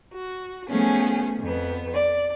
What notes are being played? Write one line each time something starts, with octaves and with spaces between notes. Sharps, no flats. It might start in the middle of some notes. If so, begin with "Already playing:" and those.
F#4
F3 A3 B3 C#4 G#4
F2 B3
D5